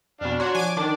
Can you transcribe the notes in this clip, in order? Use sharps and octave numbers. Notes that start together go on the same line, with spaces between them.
F2 B2 D4 F5
D4 F#4 C#5 A#5 C6 F#6
F3 G#5 D6
D#3 D4 A5 D6